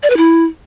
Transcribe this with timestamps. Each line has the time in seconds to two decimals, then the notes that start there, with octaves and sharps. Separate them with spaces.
0.03 D5
0.10 B4
0.17 E4